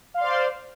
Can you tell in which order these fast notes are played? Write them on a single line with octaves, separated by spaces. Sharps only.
F5 C6 D5 C5